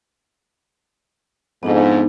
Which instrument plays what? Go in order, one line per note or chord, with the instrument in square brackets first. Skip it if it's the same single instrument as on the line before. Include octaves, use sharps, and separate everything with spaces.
[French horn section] F2 G#2 [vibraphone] B3 D4 D#4